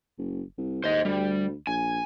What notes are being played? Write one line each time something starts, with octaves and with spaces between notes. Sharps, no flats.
F#1
C2
D#2 C5 D#5
D2 G3
A#1 G#5